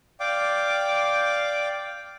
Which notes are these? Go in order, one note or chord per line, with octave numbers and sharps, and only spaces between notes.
D5 F5 G5 D6